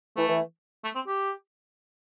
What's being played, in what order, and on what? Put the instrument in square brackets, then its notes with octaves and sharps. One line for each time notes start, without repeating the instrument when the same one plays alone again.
[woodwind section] E3 [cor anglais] A3
[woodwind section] E3
[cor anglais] A3
C4
G4